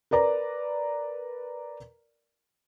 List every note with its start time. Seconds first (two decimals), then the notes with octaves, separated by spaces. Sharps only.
0.11 A#4 B4 D5 A#5